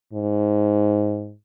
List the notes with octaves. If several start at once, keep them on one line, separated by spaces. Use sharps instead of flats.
G#2